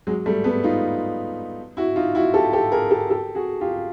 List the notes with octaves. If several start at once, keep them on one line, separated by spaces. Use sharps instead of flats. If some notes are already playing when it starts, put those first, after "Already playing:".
F#3 G#3
G3 A3
A3 B3
D#4 F4
E4 F#4
D#4 F4
E4 F#4
G4 A4
G4 A4
G#4 A#4
G4 A4
G4 A4
F#4 G#4
F4 G4